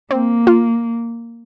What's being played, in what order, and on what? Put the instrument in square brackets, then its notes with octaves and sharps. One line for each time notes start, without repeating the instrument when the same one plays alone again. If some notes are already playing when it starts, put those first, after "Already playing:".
[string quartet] A#3 [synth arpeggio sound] C4
[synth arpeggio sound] F4